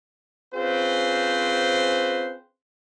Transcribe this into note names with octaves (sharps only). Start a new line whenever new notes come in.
C4 C#4 F4 G#4 B4 C5